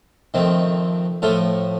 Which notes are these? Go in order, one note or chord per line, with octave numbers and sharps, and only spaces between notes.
F2 D#3 A3 C4
A2 F3 A3 F4 A4